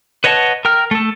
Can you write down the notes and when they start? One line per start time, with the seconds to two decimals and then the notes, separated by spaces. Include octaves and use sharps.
0.24 B4 C#5 D#5 F#5 A5
0.65 A#4 G5 F6
0.91 A3 A4